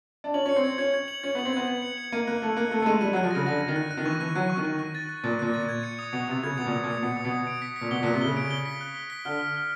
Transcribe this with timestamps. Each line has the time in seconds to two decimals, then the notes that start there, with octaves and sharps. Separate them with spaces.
0.24 D4
0.34 C#4 F#7
0.46 C#4 C#7
0.56 C4
0.64 G#6
0.78 C#4 G#6
0.94 G#6
1.08 F#7
1.23 C#4 G#6
1.35 B3
1.39 F#7
1.45 C4
1.53 B3 G#6
1.68 G#6
1.82 C#7
1.98 F#7
2.12 A#3 D#7
2.27 A#3 F#6
2.42 A3 F#6
2.57 A#3 F#6
2.71 A3 F#6
2.82 A3
2.86 G#3 D#7
3.01 G3 D#7
3.13 F#3
3.16 F#6
3.24 F3
3.31 C#3 A#6
3.46 D3 A#6
3.61 A#6
3.68 D#3
3.76 F#6
3.91 F#6
3.97 D#3
4.05 E3 C#6
4.20 E3 F#6
4.35 F#3 F#6
4.50 C#6
4.57 D#3
4.65 F#6
4.79 F#6
4.95 A6
5.09 F#6
5.24 A#2 A6
5.39 A#2 F#6
5.54 A6
5.69 G#6
5.83 C#7
5.99 D#6
6.13 B2 D#6
6.28 C3 D#6
6.43 C#3 G#6
6.58 B2 D#6
6.66 A#2
6.73 D#6
6.83 A#2
6.87 C#7
7.03 B2 C#7
7.17 D#6
7.25 B2
7.32 D#6
7.47 D7
7.62 B6
7.76 B6
7.81 A#2
7.91 B2 G7
8.03 A#2
8.06 F#6
8.13 C3
8.21 C#3 G7
8.37 D7
8.51 G7
8.65 B6
8.81 F#6
8.95 G7
9.10 B6
9.25 D3 F6
9.40 F6
9.55 F6